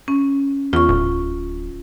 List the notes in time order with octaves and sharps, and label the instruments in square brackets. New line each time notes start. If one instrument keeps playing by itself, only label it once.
[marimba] C#4
[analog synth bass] E2 [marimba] F4 C#6
[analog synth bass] D1